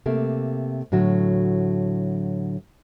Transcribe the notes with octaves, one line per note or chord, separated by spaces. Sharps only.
C3 A3 A#3
A2 D3 F#3 F#4